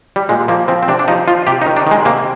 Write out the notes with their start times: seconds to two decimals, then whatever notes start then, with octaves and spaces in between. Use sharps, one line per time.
0.16 G3
0.29 A#2 G#3
0.48 F3 A#3
0.68 F3 C4
0.83 C4
0.88 C3 D4
0.99 D4
1.08 F3 D#4
1.28 F3 F4
1.47 C3 G4
1.62 D#4
1.66 D#3
1.77 D4
1.87 D#3 G#3
2.05 C3 A#3